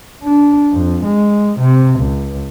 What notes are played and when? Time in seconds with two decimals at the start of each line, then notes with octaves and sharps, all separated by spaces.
0.23 D4
0.72 F2
1.04 G#3
1.59 C3
2.00 C#2